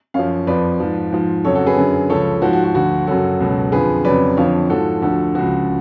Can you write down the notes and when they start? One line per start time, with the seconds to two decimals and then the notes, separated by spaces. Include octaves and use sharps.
0.14 F#2 F3 C#5 F5
0.47 F2 F3 B4 D5
0.80 G#2 F3
1.12 G#2 F3
1.45 F2 C#3 F#3 A4 C#5
1.55 F#4 A4
1.67 G#4 B4
1.78 F#2 D3 F#3
2.10 C#2 C#3 F3 A4 C#5
2.42 G#2 F3 F#4
2.53 F#4
2.64 F#4
2.75 D2 D3 F3 F#4
3.07 F#2 C#3 F#3 F#4 A4
3.40 C#2 B2 F#3
3.72 F2 D3 F3 G#4 B4
4.05 F2 C#3 F#3 B4 D5
4.37 F2 D3 F3 C#5 F5
4.69 G#2 F3 F#4 A4
5.02 D2 D3 F3 F#4 A4
5.35 C#2 C#3 F3 F#4